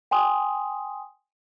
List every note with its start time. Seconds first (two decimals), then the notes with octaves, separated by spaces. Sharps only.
0.11 G5 G#5 C6 D#6